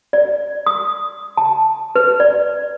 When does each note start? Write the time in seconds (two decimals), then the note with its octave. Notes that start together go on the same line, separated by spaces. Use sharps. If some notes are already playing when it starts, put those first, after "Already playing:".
0.13 D5
0.66 D#6
1.37 A5
1.96 B4
2.20 D5